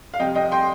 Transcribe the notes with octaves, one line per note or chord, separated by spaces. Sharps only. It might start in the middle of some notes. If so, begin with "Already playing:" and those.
F5
F2 C3 G3 D#5 G5
D#5 G5
G5 C6